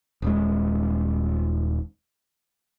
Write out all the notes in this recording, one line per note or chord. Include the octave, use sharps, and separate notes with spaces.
D#1 G#3